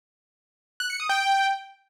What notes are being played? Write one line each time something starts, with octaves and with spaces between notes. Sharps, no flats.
F#6
C#7
D#6
G5